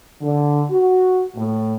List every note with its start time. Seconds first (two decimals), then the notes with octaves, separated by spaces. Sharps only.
0.21 D3
0.71 F#4
1.36 A2